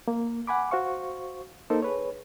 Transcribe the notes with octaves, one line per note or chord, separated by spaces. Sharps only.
A#3
F#5 G#5 B5 D6
F#4 C5 F5 C#6
A#3 D#4 A4 A#4 C5
G#4 B4 C#5